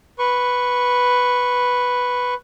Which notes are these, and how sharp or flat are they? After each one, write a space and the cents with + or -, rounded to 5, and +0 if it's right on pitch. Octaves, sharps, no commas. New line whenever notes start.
B4 +0 C#6 -10